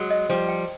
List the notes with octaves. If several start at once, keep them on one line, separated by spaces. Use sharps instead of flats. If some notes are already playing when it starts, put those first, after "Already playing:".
Already playing: F#3 G#3
D#5
F3 G3 C5
G5